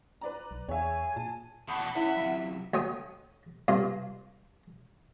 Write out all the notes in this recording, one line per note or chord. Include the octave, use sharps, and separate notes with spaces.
B4 D5 A#5
B1
E2 G#4 C#5 E5 G#5
A#2 A5
E2 B2 A4 F#5 B5
E3 C#4 E4 D5 E5
F#2 C3 F5
D2 C#5 G5 C#6 D#6
G2 C3 F4